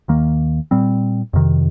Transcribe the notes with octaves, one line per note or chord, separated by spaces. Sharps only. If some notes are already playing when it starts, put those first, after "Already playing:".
D#2 D#3 A#3
A#2 G3 C4
F2 C3 D#3